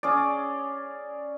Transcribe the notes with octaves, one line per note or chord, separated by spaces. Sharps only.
C#4 G#4 D5